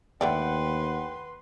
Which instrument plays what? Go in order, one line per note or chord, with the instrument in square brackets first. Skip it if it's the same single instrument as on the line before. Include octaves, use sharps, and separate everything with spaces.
[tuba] D#2 [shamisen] D3 A3 D5 [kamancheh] B4 C6 [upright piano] F#5 G5